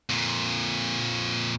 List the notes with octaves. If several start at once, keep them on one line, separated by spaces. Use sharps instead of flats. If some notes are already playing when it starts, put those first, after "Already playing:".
F2 A#2